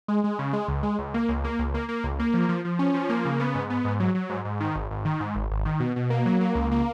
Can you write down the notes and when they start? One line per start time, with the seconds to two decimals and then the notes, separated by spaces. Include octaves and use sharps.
0.08 G#3
0.24 G#3
0.39 C#3
0.53 G#3
0.68 C#2
0.83 G#3
0.99 C#2
1.14 A#3
1.29 C#2
1.44 A#3
1.59 C#2
1.74 A#3
1.89 A#3
2.04 C#2
2.19 A#3
2.34 F3
2.49 F3
2.65 F3
2.79 C#4
2.94 F3
3.09 A#3
3.25 C#3
3.40 B3
3.55 G#2
3.70 B3
3.85 G#2
4.00 F#3
4.15 F#3
4.30 G#2
4.45 G#2
4.60 D#3
4.75 G#1
4.91 G#1
5.05 D#3
5.20 G#2
5.35 G#1
5.51 G#1
5.65 D#3
5.80 B2
5.96 B2
6.10 A#3
6.26 F#3
6.41 A#3
6.55 C#2
6.71 A#3